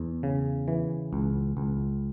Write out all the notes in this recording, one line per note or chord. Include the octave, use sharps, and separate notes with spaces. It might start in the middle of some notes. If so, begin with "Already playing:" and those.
Already playing: E2
C#3
E3
C#2
C#2